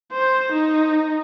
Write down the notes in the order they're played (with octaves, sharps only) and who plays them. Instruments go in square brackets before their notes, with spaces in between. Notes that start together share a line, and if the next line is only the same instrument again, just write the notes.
[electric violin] C5
D#4